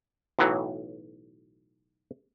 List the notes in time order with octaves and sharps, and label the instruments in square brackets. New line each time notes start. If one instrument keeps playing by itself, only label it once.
[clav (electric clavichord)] B1 A2 E3 F#3